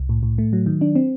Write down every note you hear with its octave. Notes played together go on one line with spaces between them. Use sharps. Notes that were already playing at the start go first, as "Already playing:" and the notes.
Already playing: C2
A2
A2
A3
F#3
D#3
D4
C4